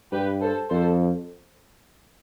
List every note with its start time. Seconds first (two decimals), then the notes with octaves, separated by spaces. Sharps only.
0.12 G2 G4 B4
0.41 A4 C5
0.69 F2 A4 C5